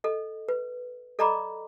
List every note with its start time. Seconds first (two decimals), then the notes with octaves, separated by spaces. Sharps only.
0.04 A4 D#5
0.49 B4
1.19 A4 D5 D#5 A#5 B5 D6